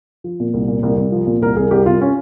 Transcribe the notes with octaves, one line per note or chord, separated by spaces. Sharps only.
F3
A#2
C2
A#2
C2
C2
F3
A#2
C2 A#4
C2 G#4
C2 G4
C2 F4
C#4